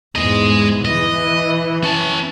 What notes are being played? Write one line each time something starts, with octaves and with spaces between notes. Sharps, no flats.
E2 G#2 G#3 D#5
E3 D#5
C#4 A5